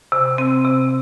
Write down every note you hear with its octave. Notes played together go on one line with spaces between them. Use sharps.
C3
C4
C3